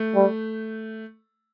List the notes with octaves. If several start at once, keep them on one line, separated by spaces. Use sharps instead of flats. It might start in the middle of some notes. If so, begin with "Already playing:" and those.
Already playing: A3
G3